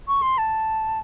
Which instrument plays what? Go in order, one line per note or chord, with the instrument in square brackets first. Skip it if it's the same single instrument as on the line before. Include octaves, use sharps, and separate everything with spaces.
[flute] C#6
C6
A5